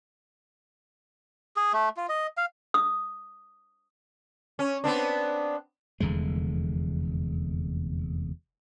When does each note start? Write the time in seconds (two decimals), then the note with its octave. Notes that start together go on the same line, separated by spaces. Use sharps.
1.56 G#4
1.73 A3
1.97 F4
2.09 D#5
2.37 F5
2.74 D#6
4.59 C#4
4.84 B3 C4 D4
6.00 F1 E2 D3 G#3